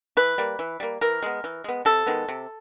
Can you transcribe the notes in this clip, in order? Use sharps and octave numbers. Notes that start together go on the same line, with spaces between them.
E3 B4
G3 A#3
E3
G3 A#3
E3 A#4
G#3 B3
E3
G#3 B3
C3 A4
D#3 G#3 B3
C3